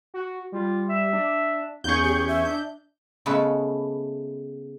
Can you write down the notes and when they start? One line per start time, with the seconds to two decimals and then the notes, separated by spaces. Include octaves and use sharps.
0.14 F#4
0.52 G3 F4
0.89 E5
1.13 D4
1.84 E2 C#4 G#4 C#6 G6
2.04 G4
2.28 E5
2.45 D4 G6
3.26 C#3 G#3 A3 B3 A4 B4